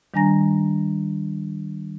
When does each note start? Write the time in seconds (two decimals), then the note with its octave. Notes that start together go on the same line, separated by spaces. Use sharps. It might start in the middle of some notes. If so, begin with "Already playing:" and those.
0.14 D#3 G3 D4 G#5 A#5 A#6